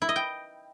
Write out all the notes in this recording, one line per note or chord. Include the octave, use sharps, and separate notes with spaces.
E4
D#5
G5